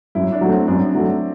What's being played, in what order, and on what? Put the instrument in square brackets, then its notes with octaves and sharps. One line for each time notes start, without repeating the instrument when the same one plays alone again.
[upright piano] F#2 [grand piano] E4
[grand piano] D4
[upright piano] F#3 A3
[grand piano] C4
[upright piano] F#2 [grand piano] D4
[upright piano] F#3 A3